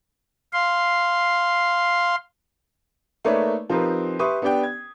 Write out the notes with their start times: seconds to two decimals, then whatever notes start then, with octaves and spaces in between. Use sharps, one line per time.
0.53 F5 C6
3.25 A3 A#3 D#4 B4 C#5 D5
3.70 F3 C4 D#4 G4 A#4 B4
4.19 G4 B4 E5 C6 C#6 D#6
4.42 B3 D4 G4 D5 G5
4.63 G#6